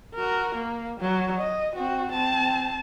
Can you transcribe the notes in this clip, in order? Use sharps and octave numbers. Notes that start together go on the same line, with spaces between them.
F#4 A#4
A#3
F#3
D#5
C4 F#4
C4 A5